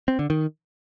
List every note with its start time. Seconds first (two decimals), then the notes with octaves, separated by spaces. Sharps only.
0.08 C4
0.19 D3
0.30 D#3